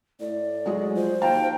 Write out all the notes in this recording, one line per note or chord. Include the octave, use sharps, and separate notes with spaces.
A2 D5
F#3 G#3 G#4
F3 C5
D#2 F5 G5 A5 A#5